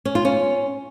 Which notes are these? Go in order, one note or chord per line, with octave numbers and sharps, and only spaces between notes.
C#4
F4
C#4